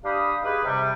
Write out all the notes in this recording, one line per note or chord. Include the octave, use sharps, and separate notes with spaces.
D4 G4 F5 B5 D#6
D#4 G4 G#4 B4
C3 G3